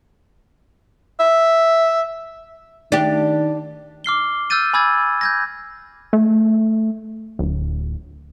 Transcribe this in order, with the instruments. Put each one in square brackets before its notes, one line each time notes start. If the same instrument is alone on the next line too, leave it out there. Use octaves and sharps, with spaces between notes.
[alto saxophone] E5
[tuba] D#3 [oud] D4 G4
[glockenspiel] D6 F6 C7 G7
E6 F6 G6 A6 D#7
G#5 B5 D6 E6 G#6 A6
G6 G#6 A#6
[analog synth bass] A3
D1